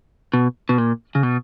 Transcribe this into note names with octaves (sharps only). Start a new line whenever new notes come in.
B2
B2
A#2
C#3
B2